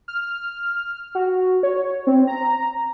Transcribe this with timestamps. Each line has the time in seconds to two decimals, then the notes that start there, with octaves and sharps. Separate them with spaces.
0.08 F6
1.15 F#4
1.63 C#5
2.07 C4
2.27 A#5